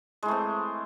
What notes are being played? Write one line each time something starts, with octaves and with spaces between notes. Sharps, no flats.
E3 G#3 A3 C4